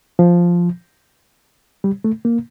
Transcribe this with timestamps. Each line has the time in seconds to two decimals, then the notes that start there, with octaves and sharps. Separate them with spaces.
0.19 F3
1.84 G3
2.04 A3
2.25 A#3